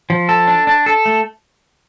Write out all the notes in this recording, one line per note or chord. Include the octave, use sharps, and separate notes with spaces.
F3
A4
D4
D4
A4
A3